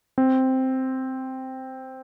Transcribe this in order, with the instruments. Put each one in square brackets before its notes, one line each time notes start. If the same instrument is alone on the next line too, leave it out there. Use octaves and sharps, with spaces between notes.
[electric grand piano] C4